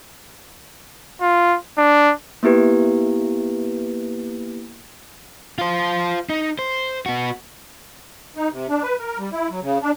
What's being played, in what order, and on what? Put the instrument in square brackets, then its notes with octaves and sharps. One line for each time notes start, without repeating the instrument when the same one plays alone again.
[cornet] F4
D4
[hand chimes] A#3 B3 E4 G4 B4
[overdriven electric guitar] F4 C5
D#4
C5
B3 F#4
[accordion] D#4
C3
D4
B4
A#4
G3
E4
F#3
C#3
D4